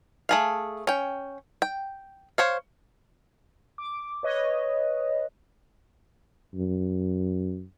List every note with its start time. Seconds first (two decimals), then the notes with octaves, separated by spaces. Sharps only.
0.29 A3 G#4 F5
0.87 C#4 G5
1.62 G5
2.38 C5 C#5 F5
3.78 D6
4.23 B4 C#5 D#5
6.54 F#2